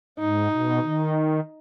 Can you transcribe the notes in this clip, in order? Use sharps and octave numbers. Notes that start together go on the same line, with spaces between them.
G#2 D#4
B2
D#3